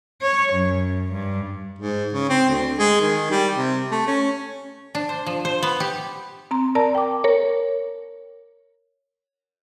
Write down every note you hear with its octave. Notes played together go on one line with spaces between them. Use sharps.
C#5
F#2
G2
G#2
C#3
C4
D2
G#3
D#3
G3
C3
A3
C#4
D4
C5
F3
C5
B3
G4
C4 A#5 C6
A#4 D5 A5 A#5
G5 D6
A#4 C#5